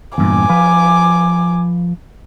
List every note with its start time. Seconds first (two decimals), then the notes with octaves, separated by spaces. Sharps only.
0.18 E2 G2 A#2 G#5 D6
0.49 F3 B4 F5